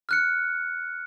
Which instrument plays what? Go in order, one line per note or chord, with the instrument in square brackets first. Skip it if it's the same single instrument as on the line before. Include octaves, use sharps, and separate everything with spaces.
[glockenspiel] F6 F#6 C#7